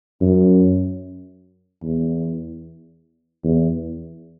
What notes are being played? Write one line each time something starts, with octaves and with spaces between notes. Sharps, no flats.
F#2
E2
E2